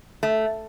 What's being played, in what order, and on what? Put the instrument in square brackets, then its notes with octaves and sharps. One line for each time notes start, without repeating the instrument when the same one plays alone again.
[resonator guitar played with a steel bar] A3